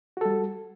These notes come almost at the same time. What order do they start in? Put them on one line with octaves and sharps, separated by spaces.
F#4 A4 G3